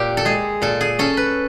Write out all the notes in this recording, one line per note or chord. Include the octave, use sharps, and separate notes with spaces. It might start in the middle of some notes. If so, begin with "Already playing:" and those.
Already playing: A#2 G4
A4
G#3 G#4
A#2 A4
G#4
C#4 A4
B4